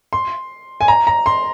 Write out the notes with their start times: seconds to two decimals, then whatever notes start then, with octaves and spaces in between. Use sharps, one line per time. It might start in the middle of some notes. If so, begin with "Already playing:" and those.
0.13 C6
0.81 G#5
0.88 A#5
1.07 A#5
1.26 C6